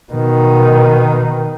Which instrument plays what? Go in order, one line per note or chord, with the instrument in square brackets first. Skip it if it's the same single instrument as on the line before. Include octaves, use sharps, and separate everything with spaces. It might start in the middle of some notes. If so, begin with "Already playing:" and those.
[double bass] B2 D#3